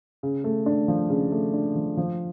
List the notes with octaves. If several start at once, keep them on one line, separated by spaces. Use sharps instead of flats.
C#3
A3
D4
F3
C#3
A3
D4
F3
F3